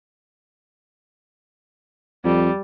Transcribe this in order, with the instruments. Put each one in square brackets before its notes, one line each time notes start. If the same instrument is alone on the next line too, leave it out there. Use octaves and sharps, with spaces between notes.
[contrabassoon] F2 [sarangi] G3